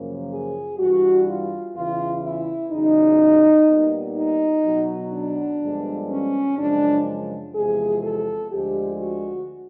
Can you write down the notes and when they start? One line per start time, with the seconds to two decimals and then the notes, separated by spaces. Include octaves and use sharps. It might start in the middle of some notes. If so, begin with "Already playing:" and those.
Already playing: F#2 C#3 F3 A#3
0.31 G#4
0.78 G2 E3 G3 F#4
1.28 F4
1.76 E2 C#3 E3 F4
2.24 E4
2.72 E2 C#3 F#3 D#4
3.69 A#2 G3 B3
4.17 D#4
4.65 B2 F#3 B3
5.13 D4
5.62 G2 D3 F3 G#3 B3
6.11 C#4
6.58 F#2 C#3 F3 G#3 D4
7.55 E2 C3 F3 G#3 G#4
8.03 A4
8.51 D2 D3 F3 G#3 G4
8.99 F#4